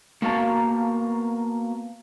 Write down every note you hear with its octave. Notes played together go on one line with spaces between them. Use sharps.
A#3 B3 F#4 F5 A5 A#5